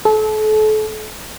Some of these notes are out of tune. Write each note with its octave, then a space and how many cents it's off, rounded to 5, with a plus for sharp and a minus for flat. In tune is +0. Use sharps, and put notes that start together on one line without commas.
A4 -35